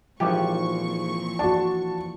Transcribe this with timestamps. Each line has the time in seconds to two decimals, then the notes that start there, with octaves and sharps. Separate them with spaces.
0.20 G#1 A#2 E3 F3 C4 G4 C#6
1.39 D4 F#4 A5